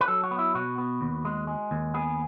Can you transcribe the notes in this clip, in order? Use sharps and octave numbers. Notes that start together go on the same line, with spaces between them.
B4
F#3 A4
F#4
B3
E4
B2 F#4
B3
D#2
G#3
G#3
D#2
B3 G#4